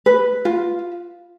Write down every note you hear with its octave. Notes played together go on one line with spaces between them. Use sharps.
B4
F4